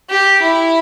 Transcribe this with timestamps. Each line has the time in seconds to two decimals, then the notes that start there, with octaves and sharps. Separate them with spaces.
0.10 G4
0.42 E4